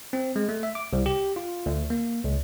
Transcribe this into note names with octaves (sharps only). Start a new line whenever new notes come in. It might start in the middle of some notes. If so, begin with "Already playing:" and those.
C4
G#3
A3
E5
D6
C2
G4
F4
D2
A#3
C#2